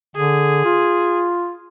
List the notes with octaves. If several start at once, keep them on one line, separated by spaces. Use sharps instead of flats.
D3 G#4
F4